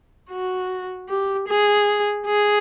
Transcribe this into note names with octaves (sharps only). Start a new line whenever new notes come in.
F#4
G4
G#4
G#4